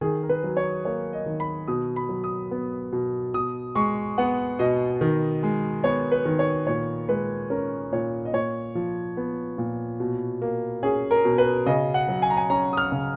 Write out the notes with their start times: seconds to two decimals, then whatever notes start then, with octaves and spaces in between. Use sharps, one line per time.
0.01 D#3 G#4
0.23 A#4
0.29 B4
0.43 F#3
0.57 C#5
0.85 A#3 C#5
1.13 D#5
1.26 D#3
1.40 B5
1.68 B2 D#6
1.96 B5
2.09 F#3
2.24 D#6
2.51 B3
2.93 B2
3.34 B2 D#6
3.75 G#3 C#6
4.18 B3 F#5
4.59 B2 D#5
5.01 D#3
5.43 G#3
5.83 B3 C#5
6.12 B4
6.25 D#3
6.39 C#5
6.67 A#2 C#5
7.09 G#3 B4
7.50 C#4 A#4
7.92 A#2 C#5
8.25 D#5
8.33 A#2 C#5
8.75 F3
9.17 B3
9.58 A#2
10.00 B2
10.42 A#3
10.83 C#4 G#4
11.11 A#4
11.25 B2
11.38 B4
11.66 C#3 D#5
11.94 F#5
12.08 F#3
12.22 G#5
12.30 A#5
12.37 G#5
12.50 C#4 A#5
12.73 D#6
12.77 F6
12.92 C#3